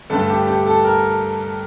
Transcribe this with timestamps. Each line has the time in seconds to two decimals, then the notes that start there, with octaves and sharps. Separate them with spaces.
0.10 G2 D3 A3 A4
0.29 G4
0.47 G4
0.66 A4
0.85 A#4